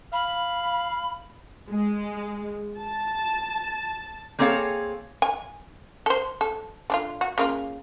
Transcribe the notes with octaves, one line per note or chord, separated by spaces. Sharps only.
F5 B5
G#3
A5
A#3 C4 G#4 A4 C#5 F5
G#5
A4 C5
A4
D3 D4 F4
F#4
C#3 A#3 F4